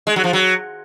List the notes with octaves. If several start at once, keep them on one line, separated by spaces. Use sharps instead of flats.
G#3
F#3
F3
F#3